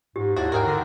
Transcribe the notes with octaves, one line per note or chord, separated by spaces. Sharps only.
G#2 G4
D#2 D4 E4 F#4
G#2 F#4 G#4 A#4 G5
D3